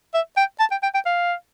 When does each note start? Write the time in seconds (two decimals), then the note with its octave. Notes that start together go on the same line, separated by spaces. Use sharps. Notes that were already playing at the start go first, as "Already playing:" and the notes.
0.14 E5
0.37 G5
0.60 A5
0.71 G5
0.83 G5
0.94 G5
1.06 F5